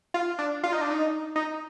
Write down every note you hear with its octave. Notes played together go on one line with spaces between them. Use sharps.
F4
D4
F4
D#4
D4
D#4
D#4